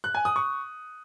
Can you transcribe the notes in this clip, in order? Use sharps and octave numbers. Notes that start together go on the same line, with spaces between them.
F#6
G#5
D#6
C#6